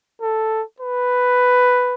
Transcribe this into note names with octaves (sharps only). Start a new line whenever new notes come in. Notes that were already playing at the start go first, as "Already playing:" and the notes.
A4
B4